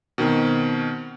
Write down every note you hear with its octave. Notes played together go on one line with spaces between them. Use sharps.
B2 D#3 C4